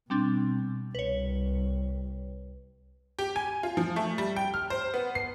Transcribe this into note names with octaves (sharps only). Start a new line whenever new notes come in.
B2 G3 C4 D4
C2 B4 C#5
G4
G#5
F4
F3
A3
G3
G5
F6
C5
B3
C7